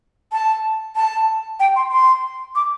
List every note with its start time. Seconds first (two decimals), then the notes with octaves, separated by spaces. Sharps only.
0.32 A5
0.96 A5
1.60 G5
1.76 C6
1.92 C6
2.55 D6